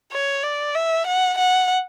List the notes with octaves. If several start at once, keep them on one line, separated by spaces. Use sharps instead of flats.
C#5
D5
E5
F#5
F#5